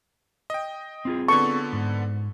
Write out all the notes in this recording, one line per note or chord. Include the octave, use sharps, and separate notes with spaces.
D#5 G5
C4 F4 G#4
D3 B3 A4 C#6
G#2